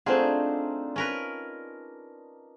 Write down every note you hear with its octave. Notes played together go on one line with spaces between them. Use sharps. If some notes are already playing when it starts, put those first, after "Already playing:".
A3 C4 D4 D#4 F4 G#4 C5 F#5
C#4 A#4 B4